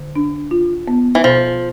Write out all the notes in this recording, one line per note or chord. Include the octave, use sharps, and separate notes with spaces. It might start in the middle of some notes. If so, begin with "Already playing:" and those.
Already playing: D3
D4
F4
B3
E3
B2 F3